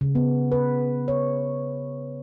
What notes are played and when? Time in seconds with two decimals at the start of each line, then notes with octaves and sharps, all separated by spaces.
0.01 C#3
0.15 B3
0.52 B4
1.08 C#5